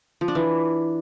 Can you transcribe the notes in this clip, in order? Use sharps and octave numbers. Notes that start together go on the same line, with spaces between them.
F3
D4
E3